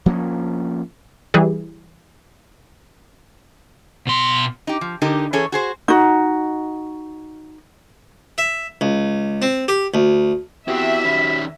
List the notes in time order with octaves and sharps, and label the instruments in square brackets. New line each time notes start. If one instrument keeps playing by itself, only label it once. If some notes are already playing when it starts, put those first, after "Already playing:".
[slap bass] F3 A#3 B3 C#4
[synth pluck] E3 G3 G#4
[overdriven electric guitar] B2 C6
[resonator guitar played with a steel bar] D#4 G4
F3
D3 D#4 G4 A#4
E3 C#4 G#4 A4 C#5
F#4 G#4 C5
[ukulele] D#4 F#4
[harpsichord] E5
C#2
C4
G4
D2
[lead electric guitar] B3 E4 [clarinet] C4 [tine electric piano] F#4 G4 [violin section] E5
[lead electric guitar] D#3 C#4 [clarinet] B5